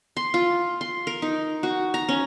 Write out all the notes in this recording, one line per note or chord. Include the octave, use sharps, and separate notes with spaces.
C6
F4
C6
A#4
D#4
F#4
A#5
C#4